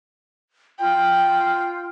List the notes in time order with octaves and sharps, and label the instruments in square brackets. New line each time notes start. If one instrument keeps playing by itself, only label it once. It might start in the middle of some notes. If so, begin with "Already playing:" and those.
[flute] F4 [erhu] G5